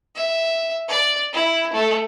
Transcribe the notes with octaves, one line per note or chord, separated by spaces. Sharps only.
E5
D5
E4
A3